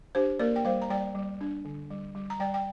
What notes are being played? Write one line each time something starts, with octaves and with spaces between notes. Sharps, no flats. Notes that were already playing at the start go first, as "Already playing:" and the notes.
D4 G4 C5
A#3 A#4 D5
G5
G3 C5 F5
A#5
G3 D5 G5
G3
D4
D3
G3
G3
A#5
G3 D5 G5
G5